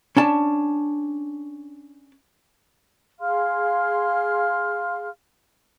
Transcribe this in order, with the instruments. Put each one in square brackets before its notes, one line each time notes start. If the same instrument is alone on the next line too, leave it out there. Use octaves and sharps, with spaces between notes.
[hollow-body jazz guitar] C#4 D4 A5
[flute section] G#4 F5 C6 F6